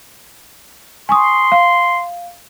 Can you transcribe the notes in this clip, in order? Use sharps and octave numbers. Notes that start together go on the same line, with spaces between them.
G#5 C6 C#6 D#6
F5